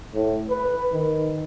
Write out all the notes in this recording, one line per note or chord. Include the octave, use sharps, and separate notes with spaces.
A2
B4
D#3